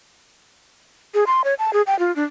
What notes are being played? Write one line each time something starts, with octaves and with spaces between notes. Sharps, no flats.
G#4
C6
C#5
A5
G#4
G5
F4
D4